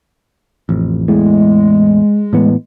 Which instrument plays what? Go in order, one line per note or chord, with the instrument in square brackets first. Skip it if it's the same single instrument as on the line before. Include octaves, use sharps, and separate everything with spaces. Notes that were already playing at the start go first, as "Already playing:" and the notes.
[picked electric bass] A1 F2
[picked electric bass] E2 A2 [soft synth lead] G#3
[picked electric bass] A2 E3 B3